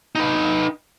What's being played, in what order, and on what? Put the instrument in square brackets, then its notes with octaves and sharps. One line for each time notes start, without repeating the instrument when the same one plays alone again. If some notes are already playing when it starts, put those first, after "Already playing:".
[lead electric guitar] D#4 B4